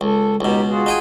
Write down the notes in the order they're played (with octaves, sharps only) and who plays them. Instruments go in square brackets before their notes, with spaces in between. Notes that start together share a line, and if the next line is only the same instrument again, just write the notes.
[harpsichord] C#2 [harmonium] A4
[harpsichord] C#2 B2 [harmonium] D#4 G4
[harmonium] F4 F#4 G#4
[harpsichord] D#4 G5 G#5